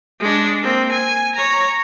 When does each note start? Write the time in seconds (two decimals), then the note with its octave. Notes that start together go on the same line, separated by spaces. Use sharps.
0.20 G#3 D4
0.63 A#3 C4
0.92 G#5
1.35 C#5 A#5